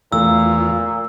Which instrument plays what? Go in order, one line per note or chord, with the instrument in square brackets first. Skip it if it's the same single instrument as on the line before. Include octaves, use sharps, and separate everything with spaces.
[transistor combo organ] E2 F4 [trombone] A#2 [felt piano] A3 [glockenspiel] E6